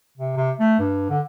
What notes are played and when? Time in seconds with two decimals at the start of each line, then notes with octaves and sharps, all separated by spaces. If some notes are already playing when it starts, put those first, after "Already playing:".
0.17 C3
0.37 C3
0.60 A3
0.79 G2
1.10 D3